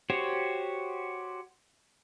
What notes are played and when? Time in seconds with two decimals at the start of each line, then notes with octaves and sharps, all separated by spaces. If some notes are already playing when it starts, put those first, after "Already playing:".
0.10 F#4 G4 C5 C#5